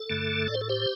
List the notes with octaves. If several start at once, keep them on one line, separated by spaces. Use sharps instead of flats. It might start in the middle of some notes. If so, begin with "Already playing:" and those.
Already playing: A4
G2 D3 A3
A2 D5
C5
A4
G4 C5